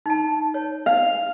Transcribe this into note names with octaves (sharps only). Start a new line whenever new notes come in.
D#4 A5
C#5
F5